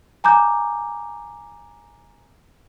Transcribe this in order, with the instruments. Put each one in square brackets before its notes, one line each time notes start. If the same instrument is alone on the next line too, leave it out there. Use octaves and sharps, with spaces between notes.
[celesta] G#5 A#5 D6 G6